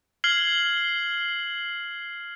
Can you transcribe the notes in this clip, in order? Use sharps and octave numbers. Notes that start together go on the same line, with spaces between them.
F6 G#6 C7 F#7 G7